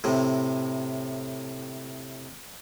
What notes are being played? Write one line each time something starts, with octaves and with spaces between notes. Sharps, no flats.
A2 C3